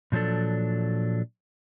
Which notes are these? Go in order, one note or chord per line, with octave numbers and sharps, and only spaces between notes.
A#2 F3 F#3 D4 A4